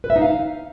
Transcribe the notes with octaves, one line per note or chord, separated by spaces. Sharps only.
B4
E5
D#4
F5